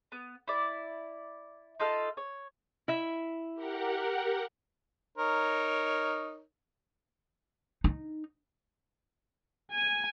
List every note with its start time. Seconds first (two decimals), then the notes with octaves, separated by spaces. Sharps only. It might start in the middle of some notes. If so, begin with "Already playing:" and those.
0.12 B3
0.48 E4 D5
1.80 D#4 F4 A4 F5
2.17 C#5
2.88 E4 E5
3.54 G4 A#4 F#5
5.18 D#4 A#4 C#5
7.84 D#4
9.72 G#5